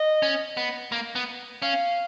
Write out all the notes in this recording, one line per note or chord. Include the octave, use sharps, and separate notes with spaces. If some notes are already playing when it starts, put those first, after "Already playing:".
Already playing: D#5
C#4
B3
A#3
B3
C#4 F5